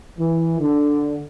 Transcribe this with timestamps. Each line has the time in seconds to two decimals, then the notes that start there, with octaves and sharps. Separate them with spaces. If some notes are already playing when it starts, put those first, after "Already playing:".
0.18 E3
0.59 D3